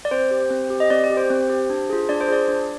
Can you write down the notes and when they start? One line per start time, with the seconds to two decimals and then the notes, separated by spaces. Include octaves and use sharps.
0.05 D5
0.11 C4 C5
0.31 G4
0.50 C4
0.70 G4
0.80 D#5
0.90 C4 D5
1.04 D5
1.10 G4
1.17 C5
1.30 C4
1.50 G4
1.70 D4
1.90 F4 G#4
2.09 D4 D5
2.21 C5
2.28 F4 G#4 D5
2.48 D4